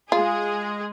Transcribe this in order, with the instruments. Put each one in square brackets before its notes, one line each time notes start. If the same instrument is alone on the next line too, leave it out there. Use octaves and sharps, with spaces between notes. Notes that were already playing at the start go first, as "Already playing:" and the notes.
[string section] G#3 G#4 [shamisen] F4